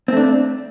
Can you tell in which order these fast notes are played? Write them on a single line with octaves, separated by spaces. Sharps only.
C4 A3 D4